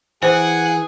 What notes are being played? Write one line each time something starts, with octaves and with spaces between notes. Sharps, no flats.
E3 G#4 C5 F#5 G#5